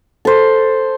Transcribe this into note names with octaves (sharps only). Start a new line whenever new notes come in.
A4 C5